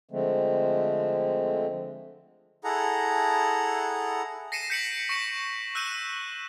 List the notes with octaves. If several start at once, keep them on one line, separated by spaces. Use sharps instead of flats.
D3 F3 G#3 A3 C4
E4 G#4 A4 F#5 A#5
A#6 C7 C#7 D#7 E7
G6 B6 C#7 D7 F#7
C#6 A#6 C#7 D7 E7
E6 F#6 G6 D#7 E7